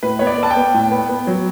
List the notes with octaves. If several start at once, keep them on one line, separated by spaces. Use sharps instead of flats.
A2 B4
B3 C#5
D5
B3 A5
G5
B3
A2
B3
B3
F#3